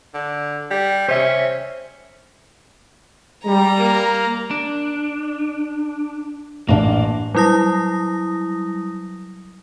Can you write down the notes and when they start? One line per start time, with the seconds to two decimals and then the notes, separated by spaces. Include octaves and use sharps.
0.14 D3
0.71 G3
1.08 C#4 C5 E5
3.46 G3 A#5
3.79 A#3
4.51 D4
6.69 A1 A#3 D4
7.34 F#3 G3 E4 D#6 A#6